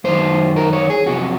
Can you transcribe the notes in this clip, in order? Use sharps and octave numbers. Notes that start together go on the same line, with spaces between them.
F#2 D#3 F#3 C5
A#4
C#5
G#4
F2 C3 F#3 F#4